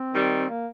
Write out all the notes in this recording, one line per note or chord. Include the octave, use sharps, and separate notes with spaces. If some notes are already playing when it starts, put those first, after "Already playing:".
Already playing: C4
D#3 G3
A#3